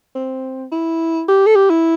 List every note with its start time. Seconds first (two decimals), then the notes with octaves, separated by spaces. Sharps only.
0.15 C4
0.72 E4
1.28 G4
1.46 A4
1.56 G4
1.70 E4